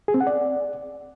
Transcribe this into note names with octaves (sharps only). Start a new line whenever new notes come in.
G#4
C4
F#5
D5